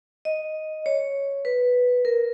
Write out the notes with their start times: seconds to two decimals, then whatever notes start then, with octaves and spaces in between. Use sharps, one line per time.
0.25 D#5
0.86 C#5
1.45 B4
2.05 A#4